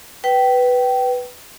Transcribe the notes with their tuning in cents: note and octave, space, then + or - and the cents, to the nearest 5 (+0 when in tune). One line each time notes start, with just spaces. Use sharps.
B4 +0 G5 -20